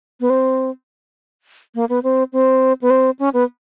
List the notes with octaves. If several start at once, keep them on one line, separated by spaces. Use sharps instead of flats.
B3
C4
A#3
B3
C4
C4
B3
C4
C#4
B3